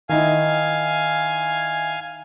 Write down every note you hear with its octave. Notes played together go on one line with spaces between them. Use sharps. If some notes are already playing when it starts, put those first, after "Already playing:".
D#3 D#4 E4 F5 G#5